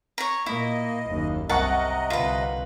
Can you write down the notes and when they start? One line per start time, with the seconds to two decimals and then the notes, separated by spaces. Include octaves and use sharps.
0.18 C#5 A#5
0.46 A#2 A#3 E4 D#5
1.08 F#1 D#2
1.49 C2 C3 A#4 D#5 F#5 A5 C#6
2.10 C2 D3 F4 B4